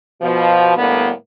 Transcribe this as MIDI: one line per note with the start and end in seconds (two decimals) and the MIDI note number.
0.22 0.75 47
0.22 0.75 53
0.77 1.10 45
0.77 1.10 50
0.77 1.10 55
0.77 1.10 58
0.77 1.10 59